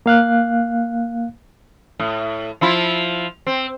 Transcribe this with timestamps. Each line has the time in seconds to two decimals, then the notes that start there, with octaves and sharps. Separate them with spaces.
0.06 A#3 F5 F#6
1.99 A2
2.61 F3 E4 F4
3.47 C4